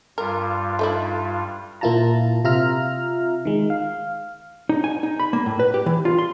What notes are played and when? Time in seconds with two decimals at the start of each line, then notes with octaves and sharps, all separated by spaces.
0.18 G2 G3 F4 A#4
0.79 A3 D#4 E4
1.81 A#2 A#3 E4 F4 A5 A#5
2.44 C3 F4 E5 A#5 F6
3.45 D#3 G#3
3.70 F5
4.69 D#4
4.84 G#5
5.03 D#4
5.20 B5
5.33 A#3
5.46 A2
5.60 B4
5.74 G4
5.86 E3
6.05 F4
6.18 C6